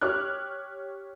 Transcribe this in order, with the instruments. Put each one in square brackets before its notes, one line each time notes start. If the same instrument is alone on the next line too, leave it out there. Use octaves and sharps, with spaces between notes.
[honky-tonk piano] G4 C#5 D6 F6 F#6